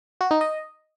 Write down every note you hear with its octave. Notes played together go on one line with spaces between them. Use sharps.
F#4
D#4
D#5